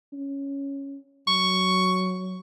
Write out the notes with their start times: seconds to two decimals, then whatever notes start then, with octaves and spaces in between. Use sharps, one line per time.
0.13 C#4
1.28 F#3 C#6